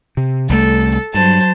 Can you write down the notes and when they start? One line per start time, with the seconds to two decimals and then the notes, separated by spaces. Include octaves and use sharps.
0.17 C3
0.49 C2 G3 A3 A4
1.14 G2 F#3 C5 A5